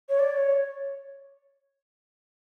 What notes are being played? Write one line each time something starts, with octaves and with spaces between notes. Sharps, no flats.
C#5
D5
C#5